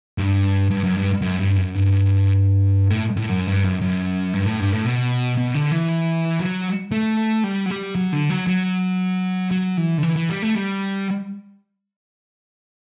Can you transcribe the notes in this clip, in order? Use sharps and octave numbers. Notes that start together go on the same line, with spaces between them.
G2
G2
F#2
G2
F#2
G2
F#2
G2
A2
A2
F#2
G2
F#2
F#2
G2
A2
G2
A2
B2
B2
D3
E3
F#3
A3
G3
F#3
G3
F#3
D3
F#3
F#3
F#3
E3
D3
E3
E3
G3
A3
G3